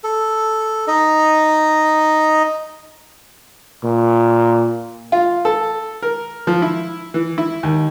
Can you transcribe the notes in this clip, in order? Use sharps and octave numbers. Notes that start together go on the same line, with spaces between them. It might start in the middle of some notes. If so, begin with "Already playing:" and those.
A4
D#4 D#5
A#2
F4
A4
A#4
F3
E4
E3
E4
D#2